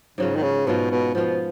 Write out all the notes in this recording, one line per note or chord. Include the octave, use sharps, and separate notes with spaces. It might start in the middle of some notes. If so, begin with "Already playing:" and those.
G#2 C#3 F#3 C#4 F4
D#3
C#3
G#2 B2 F#3 C#4 F4
B2
B2 F3 B3 F4